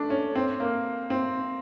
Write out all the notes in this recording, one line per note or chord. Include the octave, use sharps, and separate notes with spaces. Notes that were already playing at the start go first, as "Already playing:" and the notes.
Already playing: A3 D4
C#4
C4
A#3
C4